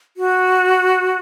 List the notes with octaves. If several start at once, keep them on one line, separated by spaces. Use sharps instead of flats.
F#4